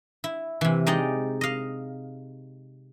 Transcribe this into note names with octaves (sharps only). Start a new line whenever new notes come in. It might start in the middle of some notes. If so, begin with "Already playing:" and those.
E4
C3 E3
G#3 D#4 D5 G5
D#5 F5